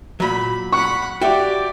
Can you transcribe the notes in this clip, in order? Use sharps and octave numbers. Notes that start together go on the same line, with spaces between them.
A#2 F#3 B5
F#5 B5 C#6
F#4 G4 D5 E5 G5